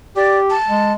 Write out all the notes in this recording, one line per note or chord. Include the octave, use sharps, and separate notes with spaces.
G4 D5
A5
G#3